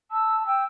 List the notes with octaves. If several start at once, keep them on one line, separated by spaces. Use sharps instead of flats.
A5 E6
G5 E6